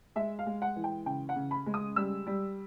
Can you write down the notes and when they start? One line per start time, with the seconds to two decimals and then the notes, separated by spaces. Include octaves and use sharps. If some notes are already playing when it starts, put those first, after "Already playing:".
0.16 G#3 E5
0.39 F5
0.46 G#3
0.62 F#5
0.76 E3
0.84 G5
1.06 C#3 G5
1.29 F#5
1.36 C#3
1.51 B5
1.66 G#3
1.74 D#6
1.96 G3 E6
2.27 G3